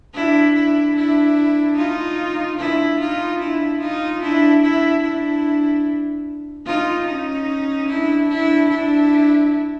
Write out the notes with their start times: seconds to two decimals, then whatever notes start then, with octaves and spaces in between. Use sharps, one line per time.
0.14 D4 E4
0.54 D4 E4
0.95 D4 E4
1.77 D#4 F4
2.58 D4 E4
2.99 D#4 F4
3.39 D4 E4
3.80 D#4 F4
4.21 D4 E4
4.62 D4 E4
5.03 D4 E4
6.66 D#4 F4
7.06 C#4 D#4
7.88 D4 E4
8.28 D4 E4
8.69 D4 E4